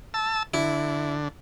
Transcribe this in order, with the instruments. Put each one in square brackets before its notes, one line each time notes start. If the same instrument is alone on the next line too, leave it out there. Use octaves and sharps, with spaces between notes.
[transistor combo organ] A5 E6
[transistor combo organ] D3 [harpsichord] E4